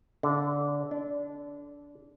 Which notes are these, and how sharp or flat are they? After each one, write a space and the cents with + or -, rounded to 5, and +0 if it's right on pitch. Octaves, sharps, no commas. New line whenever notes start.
D3 -20
D4 -20